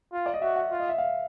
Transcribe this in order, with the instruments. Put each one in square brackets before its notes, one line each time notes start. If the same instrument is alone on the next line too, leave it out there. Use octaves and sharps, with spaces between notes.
[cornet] F4
[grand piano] D5
D#5
[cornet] F#4 [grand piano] E5
[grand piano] F#5
[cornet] F4
[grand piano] D#5
E5
F5